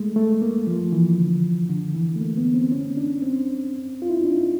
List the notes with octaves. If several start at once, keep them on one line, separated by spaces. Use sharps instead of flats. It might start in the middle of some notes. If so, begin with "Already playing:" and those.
Already playing: G#3 A3
A3
A#3
F3
E3
D3
D3
E3
A3
A#3
B3
C4
C#4
D4
C4
F4
E4
D#4
D4